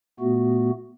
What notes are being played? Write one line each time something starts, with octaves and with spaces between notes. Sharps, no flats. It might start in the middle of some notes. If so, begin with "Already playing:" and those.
A#2 A3 B3 F#4